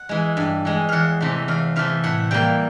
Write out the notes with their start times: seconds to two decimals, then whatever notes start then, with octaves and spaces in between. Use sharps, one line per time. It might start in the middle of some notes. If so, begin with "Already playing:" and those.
Already playing: F#5
0.09 E3 G#3
0.37 G2
0.65 E3 G#3
0.89 E2 F5 F#5
1.20 C3 E3 A3
1.48 E2 F5
1.76 C3 E3 A3 F5
2.04 A2 F#5
2.31 E3 G3 A#3 G5